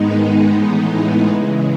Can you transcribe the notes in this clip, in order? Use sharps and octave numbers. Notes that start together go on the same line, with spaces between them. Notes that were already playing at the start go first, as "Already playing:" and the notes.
Already playing: G#2 D#3 G#3 B3 D#4
A2 E3 G#3 B3 D#4
C#3 E3 G#3